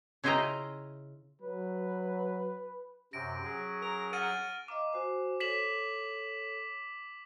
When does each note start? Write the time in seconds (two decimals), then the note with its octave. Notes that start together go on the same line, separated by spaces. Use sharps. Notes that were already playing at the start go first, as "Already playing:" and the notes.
0.24 C#3 E4 F4 D#5 G5 A#5
1.42 F#3 B4
3.13 F#2 C3 A#6 D7
3.44 F#3 C#4 G#4
3.82 A#4
4.13 F#5 F6 A6 D#7
4.68 D#5 F5 A#5 D6
4.93 F#4 C5 G#5
5.40 A4 C#5 B6 E7 F#7